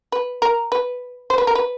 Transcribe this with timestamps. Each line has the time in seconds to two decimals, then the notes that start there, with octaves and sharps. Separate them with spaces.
0.12 B4
0.42 A#4
0.72 B4
1.30 C5
1.38 B4
1.47 A#4
1.55 B4